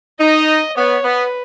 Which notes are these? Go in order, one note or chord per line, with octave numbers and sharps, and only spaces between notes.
D#4 D#5
B3 C#5
B3 B4